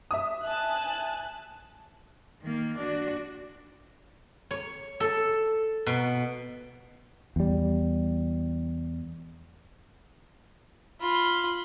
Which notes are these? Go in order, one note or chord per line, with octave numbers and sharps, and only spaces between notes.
E5 D#6
G#5 A5 F#6
D#3 A#3
D4 F#4
C#5
A4
B2
E2 G3
F4 B5